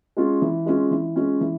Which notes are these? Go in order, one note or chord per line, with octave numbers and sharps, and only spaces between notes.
G#3 C#4 F4
E3
G#3 C#4 F4
E3
G#3 C#4 F4
E3